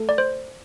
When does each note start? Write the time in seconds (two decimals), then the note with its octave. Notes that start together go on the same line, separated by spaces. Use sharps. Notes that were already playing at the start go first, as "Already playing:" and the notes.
Already playing: A3 A4
0.09 D5
0.18 C5